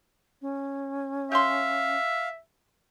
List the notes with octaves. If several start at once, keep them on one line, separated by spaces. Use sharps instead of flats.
C#4
G4 E5 F5 C6